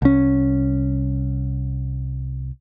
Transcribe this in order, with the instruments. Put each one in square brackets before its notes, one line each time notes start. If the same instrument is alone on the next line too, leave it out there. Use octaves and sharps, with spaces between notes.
[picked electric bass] C2 C#4